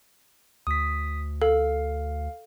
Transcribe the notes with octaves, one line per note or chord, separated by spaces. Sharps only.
D2 D#6 B6
A4 F5